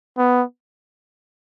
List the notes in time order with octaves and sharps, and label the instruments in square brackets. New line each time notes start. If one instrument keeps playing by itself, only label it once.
[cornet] B3